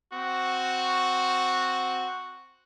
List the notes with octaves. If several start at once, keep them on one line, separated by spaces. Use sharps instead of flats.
C4 F#4